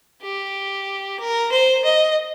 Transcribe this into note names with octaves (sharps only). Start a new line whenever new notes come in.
G4
A#4
C5
D#5